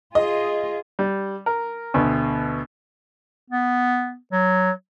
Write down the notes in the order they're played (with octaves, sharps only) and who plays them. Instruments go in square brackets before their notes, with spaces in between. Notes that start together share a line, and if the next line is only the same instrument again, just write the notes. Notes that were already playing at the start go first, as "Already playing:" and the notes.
[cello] F4 G#4 [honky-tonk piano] D#5
[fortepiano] G3
A#4
D2 B2
[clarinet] B3
F#3